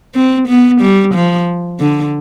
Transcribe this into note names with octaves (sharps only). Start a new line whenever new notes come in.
C4
B3
G3
F3
D3